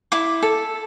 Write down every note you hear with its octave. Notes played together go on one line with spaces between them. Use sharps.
E4 D6
A4